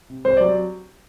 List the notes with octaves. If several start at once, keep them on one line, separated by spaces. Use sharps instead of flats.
C3
C2 C5
F#3 D5